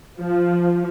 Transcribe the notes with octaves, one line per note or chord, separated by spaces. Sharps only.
F3